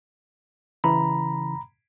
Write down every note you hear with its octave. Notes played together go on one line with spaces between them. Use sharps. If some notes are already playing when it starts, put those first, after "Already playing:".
C#3 E3 A#5 B5